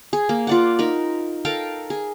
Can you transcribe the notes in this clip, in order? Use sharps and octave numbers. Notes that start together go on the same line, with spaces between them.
G#4
A#3
F4 D5 F#5
D#4 A#4 B5
A4 A#4 F5 G5
G#4